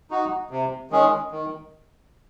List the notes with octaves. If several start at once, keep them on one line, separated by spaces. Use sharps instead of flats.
D#4 F#4
C3
D#3 G#3 C#4 G#4
D#3